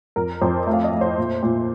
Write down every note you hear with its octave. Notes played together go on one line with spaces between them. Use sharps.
F2 A#4
F2 C5
A3
F5
D#5
A3
C5
A#2
A#2